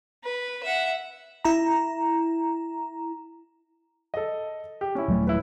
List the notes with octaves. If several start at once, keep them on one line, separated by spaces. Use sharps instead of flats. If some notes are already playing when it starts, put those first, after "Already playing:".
B4
E5 F#5
E4 A#5
A4 D#5
G4
C#4 E4
D#1 F#3 A3
E4 B4